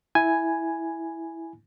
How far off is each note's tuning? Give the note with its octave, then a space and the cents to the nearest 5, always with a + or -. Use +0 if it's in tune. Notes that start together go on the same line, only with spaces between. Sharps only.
E4 +0 G#5 +0 B5 +0